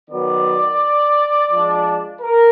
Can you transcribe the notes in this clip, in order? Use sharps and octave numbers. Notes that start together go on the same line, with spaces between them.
D#3 F#3 B3 D5
F3 G#3 D4
A#4